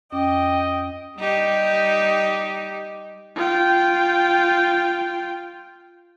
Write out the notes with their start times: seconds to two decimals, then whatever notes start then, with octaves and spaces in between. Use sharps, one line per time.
0.12 F2 C#4 D#5 G5 D6
1.18 G3 D#4 G4
3.36 F4 G5